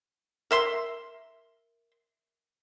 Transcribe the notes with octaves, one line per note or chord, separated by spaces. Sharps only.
A#4 E5 C6